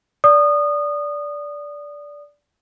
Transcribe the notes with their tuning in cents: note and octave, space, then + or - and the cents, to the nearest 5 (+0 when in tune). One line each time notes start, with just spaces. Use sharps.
D5 -10 D#6 -25